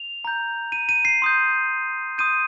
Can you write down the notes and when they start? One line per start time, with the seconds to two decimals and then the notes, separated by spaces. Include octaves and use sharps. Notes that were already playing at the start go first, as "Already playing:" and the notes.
Already playing: F7
0.25 A#5 G6
0.72 D#7
0.89 D#7
1.05 C7
1.22 C6 D#6 G6
2.18 C6 D#6 G6 D#7